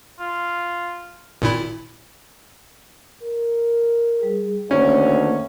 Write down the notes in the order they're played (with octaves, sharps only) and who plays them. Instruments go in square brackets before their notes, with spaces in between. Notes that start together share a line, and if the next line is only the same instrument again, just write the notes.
[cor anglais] F4
[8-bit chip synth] G#1 A#2 E4
[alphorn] A#4
[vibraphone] G3 G#4
[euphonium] D2 [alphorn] D#3 [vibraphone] A#3 B4 C#5 [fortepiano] C#4